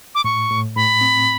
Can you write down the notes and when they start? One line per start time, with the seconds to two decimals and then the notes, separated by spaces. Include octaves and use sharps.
0.15 D6
0.24 A2 C#6
0.51 A2
0.76 A2 B5
1.01 C4